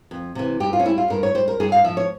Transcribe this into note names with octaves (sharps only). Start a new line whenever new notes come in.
F2
C3 E3
G2 G4
F4
C#4
G3 E4
F4
G2 A#4
C#5
G3 C5
A#4
G2 G#4
F5
F3 E5
C#5